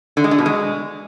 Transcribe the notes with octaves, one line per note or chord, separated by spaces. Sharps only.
D3
G#3
D3
B2
G#3